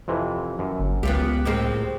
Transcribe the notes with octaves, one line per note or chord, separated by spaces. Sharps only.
F2 C3 E3
F#2
G1
C#2 B3 F4 G4
A2 G#3 C4 G4 A#4